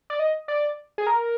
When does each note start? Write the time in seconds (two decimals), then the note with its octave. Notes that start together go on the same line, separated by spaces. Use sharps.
0.10 D5
0.19 D#5
0.48 D5
0.98 G#4
1.07 A#4